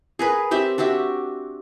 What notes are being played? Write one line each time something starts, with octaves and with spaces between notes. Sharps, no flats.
G#4 A#4 B4
C4 G4 E5
D4 F#4 G4 E5